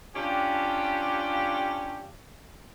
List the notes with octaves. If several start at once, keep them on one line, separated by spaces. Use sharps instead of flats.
C#4 D4 F4 G4